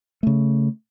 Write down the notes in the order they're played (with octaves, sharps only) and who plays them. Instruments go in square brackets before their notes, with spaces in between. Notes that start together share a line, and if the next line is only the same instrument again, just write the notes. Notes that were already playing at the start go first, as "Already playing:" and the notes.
[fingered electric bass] C#3 A3